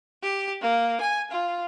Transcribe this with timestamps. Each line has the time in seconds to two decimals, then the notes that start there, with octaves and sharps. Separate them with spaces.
0.23 G4
0.61 A#3
1.01 G#5
1.31 F4